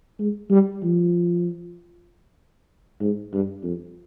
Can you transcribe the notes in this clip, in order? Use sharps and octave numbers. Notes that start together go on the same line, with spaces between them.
G#3
G3
F3
G#2
G2
F2